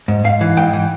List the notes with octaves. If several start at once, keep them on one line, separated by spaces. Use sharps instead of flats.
G#2
G#2 F5
E3
G#2 G5
E3